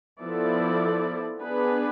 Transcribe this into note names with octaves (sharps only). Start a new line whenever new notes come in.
F3 B3 E4 A4 D5
B3 D4 G#4 B4